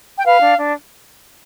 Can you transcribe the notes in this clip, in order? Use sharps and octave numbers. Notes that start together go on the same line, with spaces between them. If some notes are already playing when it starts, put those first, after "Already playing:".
G5
B4 F5
D4
D4